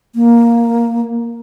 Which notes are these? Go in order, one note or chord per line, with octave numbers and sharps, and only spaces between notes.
A#3